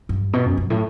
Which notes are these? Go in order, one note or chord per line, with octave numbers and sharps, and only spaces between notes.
G2
B2
F#2
F#2
A2